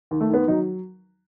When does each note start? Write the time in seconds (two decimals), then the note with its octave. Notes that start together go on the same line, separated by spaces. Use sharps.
0.11 D#2
0.20 A3
0.30 D#3 B3
0.48 F#3 D#4